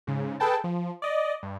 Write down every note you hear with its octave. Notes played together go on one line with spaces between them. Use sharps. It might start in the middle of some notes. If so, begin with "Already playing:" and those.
G#2 C#3
G#4 A4 B4 G5 A5
F3
D5 D#5
G2